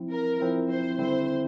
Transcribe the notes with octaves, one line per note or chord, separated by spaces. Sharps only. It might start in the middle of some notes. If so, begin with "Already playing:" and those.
Already playing: F3 C4 E4
A#4
F3 C4 E4
C5
D3 G3 C4 E4 C5